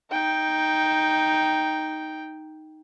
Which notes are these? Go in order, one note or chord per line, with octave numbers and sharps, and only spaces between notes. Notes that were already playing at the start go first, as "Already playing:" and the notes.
D#4 G5